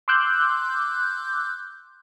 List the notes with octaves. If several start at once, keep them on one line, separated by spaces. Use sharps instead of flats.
C6 D6 E6 F#6 G6